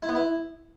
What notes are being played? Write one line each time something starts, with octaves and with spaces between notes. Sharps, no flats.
E4
B3
E4